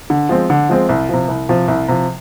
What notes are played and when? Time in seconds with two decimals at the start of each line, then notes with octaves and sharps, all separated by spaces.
0.10 D3
0.29 F3 G#3 C4
0.50 D3
0.69 F3 G#3 C4
0.89 C2
1.09 C3 F3
1.28 C2
1.49 C3 F3
1.68 C2
1.88 C3 F3